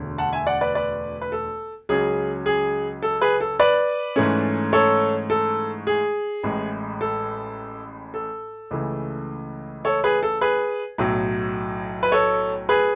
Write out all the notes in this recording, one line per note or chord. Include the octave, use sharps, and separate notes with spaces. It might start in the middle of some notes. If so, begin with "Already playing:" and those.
Already playing: E1 D2 D3
F#5 A5
E5 G#5
D5 F#5
B4 D5
B4 D5
B4
A4
C#2 C#3 F#3 C#4 G#4
G#4
A4
G#4 B4
A4
B4 D5
G#2 E3 A3 C#4
A4 C#5
A4
G#4
A1 A2 G#3
A4
A4
C#2 C#3 E3 A3
A4 C#5
G#4 B4
A4
G#4 B4
B1 A2 F#3
B4
A4 C#5
G#4 B4